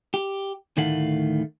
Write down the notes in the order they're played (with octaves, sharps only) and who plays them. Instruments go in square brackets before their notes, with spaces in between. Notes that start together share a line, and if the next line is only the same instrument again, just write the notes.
[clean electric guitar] G4
D2 A2 D#3 A3 F5 F#5